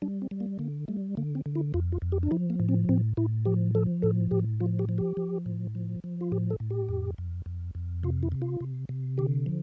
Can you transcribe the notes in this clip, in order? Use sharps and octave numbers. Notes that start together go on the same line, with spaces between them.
G3 D4
C4
G3
A#3
D3 A#3
G3 A3
D3 A#3
C4
D3
E4
F2 F4
F4
F2
G4
D4
F3 E4
A#3
A2
C4
A2 C4
A2 E4
F3 G4
F3 A4
A2 A4
A2 G4
F3 F4
G4
F3
G4
F3
A2
F3
F3
F4
A2 G4
A4
A2
G4
F2
F2
F2
F2
C3 F4
E4
C3
F4
C3
C3
D3 G4
F3